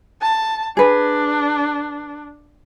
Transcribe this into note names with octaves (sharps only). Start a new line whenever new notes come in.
A5
D4 G#4 B4